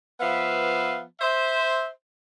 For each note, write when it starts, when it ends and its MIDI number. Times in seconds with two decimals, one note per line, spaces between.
0.20 1.03 53
0.20 1.03 59
0.20 1.03 71
0.20 1.03 76
0.20 1.03 77
1.20 1.90 72
1.20 1.90 76